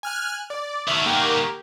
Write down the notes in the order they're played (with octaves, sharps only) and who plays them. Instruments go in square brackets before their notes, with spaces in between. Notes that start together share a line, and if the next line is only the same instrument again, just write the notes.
[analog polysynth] G#5 F6 F#6
D5
[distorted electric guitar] D#3 F#4 [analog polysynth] E5
[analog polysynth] A#3 G4 A#4